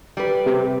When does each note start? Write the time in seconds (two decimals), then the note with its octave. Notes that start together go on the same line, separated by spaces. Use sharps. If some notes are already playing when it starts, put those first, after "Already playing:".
0.17 G3 B4
0.46 C3